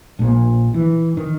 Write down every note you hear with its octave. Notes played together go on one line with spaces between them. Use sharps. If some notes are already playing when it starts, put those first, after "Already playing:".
A#1 A#2
E3
D#3